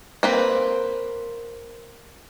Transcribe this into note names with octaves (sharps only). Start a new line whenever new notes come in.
A#3 C4 B4